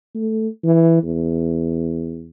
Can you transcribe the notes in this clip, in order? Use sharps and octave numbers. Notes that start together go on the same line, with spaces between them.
A3
E3
E2